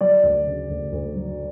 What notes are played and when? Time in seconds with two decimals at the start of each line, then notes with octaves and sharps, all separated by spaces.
0.01 F#3 D5
0.23 D2
0.47 C#3
0.69 D2
0.92 D2
1.16 F#3